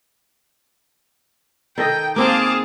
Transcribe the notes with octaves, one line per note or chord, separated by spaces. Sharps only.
D#3 A4 D#5 G5
A#3 C4 G#4 F5 G5 A5 D6